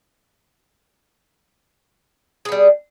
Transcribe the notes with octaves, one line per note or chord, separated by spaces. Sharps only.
G3 B3 G#4